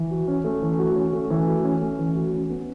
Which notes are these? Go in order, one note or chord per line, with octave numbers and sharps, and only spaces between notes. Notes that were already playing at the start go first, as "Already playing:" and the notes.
Already playing: E3
F#4
C#4
A3
E3
F#4
C#4
A3
E3
F#4
C#4
A3
E3
F#4
C#4
B3